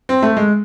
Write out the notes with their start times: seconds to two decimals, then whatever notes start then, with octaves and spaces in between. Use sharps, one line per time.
0.09 C4
0.22 A3
0.37 G#3